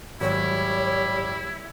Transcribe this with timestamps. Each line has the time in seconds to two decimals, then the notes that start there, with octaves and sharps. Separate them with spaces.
0.21 G#1 F#3 G3 E4 C#5